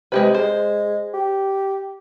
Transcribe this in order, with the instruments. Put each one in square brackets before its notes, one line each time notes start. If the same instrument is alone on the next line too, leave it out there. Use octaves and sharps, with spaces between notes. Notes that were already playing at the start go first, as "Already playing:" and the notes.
[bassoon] C3 [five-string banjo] G#3 G4 B4
[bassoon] G#3 [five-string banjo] C5
[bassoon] G4